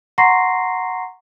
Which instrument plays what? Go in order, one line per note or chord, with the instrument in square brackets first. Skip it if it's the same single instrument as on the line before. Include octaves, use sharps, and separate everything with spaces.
[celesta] F#5 A#5 C6 C#6 A#6 C7